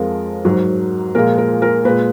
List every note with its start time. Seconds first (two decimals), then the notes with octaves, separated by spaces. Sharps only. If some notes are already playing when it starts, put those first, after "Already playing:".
Already playing: F2 F3 G#3 A#4
0.45 G#2 F#3
1.15 A#2 F3 G#3 A#4
1.38 A#4
1.62 A#4
1.85 A#2 G#3 B4